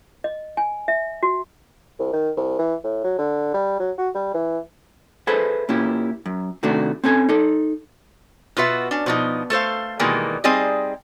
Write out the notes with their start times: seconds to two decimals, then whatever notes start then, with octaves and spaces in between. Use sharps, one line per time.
0.24 D#5
0.57 G#5
0.88 E5
1.23 F#4
2.00 C2
2.13 D#3
2.37 C2
2.59 E3
2.84 A2
3.04 F#3
3.18 D3
3.54 G3
3.80 F#3
3.98 F#4
4.15 G3
4.34 E3
5.27 G#4 A4 B4 C5 E5
5.69 A#2 C#4 E4 G4
6.26 F#2
6.63 C3 D#3 A3 D4 F#4
7.04 C4 C#4 A4 G#5
7.29 D#4 A4
8.57 B2 F4 F#4 B4 E5
8.91 C#4 D4
9.06 B2 F3 D#4
9.50 A3 A4 C5 F5
9.99 B2 D#3 E3 G3 G#3 A#3
10.44 G3 C4 D#4 G#4 D5 D#5